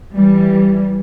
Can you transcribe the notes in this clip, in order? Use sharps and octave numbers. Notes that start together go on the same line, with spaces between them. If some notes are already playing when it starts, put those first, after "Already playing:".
E3 G3